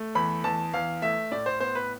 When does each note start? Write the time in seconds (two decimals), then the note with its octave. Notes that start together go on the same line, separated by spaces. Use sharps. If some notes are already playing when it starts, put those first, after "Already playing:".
Already playing: A3
0.15 E2 B5
0.44 E2 A5
0.74 E2 F5
1.02 A3 E5
1.32 A2 D5
1.46 C5
1.60 B3 C5
1.75 B4